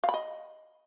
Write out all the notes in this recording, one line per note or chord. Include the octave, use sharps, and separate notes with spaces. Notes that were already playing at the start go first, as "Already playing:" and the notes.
F5
B5
D#5